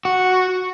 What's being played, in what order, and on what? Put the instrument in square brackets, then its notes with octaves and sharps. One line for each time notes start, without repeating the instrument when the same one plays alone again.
[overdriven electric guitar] F#4